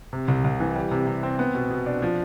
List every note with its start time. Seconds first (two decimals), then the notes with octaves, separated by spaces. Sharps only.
0.13 C3
0.28 C2
0.44 C2
0.60 E3
0.76 G3
0.91 C3
1.07 C3
1.23 C4
1.39 B3
1.55 B2
1.71 B2
1.86 D4
2.02 F3